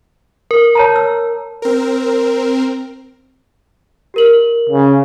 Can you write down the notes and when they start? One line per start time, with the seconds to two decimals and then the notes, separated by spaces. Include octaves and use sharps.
0.51 A#4
0.75 C#5 A5 A#5
0.96 E6
1.62 C4 A#4
4.14 G4 A#4 F#7
4.69 C#3